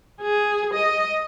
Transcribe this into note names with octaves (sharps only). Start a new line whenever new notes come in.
G#4
D#5